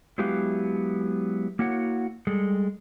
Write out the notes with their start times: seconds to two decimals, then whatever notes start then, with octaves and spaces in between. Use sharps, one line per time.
0.18 F#3 G#3 B3 E4 G4 F5
1.59 A#3 E4 F#4 C#5 F#5
2.27 G3 G#3 A4